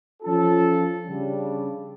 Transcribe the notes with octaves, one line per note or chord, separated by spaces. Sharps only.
F3 C#4 F4 A4
C#3 G3 D4